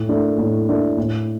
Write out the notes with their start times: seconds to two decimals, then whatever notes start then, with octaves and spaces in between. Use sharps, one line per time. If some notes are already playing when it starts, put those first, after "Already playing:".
Already playing: A2
0.09 A3 D4
0.38 A2
0.69 A3 D4
0.97 A2